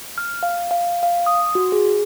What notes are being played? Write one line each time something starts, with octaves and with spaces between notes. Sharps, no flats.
F6
F5
F5
F5
D#6
F#4
G#4